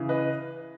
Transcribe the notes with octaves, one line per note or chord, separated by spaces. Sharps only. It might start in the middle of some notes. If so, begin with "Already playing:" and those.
Already playing: C#3 E3
B4 D#5